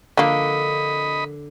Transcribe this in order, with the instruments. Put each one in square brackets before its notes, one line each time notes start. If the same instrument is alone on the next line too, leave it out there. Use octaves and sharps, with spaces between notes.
[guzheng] D3 [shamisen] F3 A#3 [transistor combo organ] D#5 B5